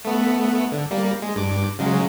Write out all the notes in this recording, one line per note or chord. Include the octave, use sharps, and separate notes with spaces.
A3 B3
D3
G3 A#3
G#3
G2 D6
C#3 F#3 G#3